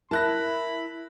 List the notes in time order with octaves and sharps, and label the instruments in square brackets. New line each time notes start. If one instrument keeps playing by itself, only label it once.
[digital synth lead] E4 [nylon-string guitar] A#4 [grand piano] A5 F#6 A#6 [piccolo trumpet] B5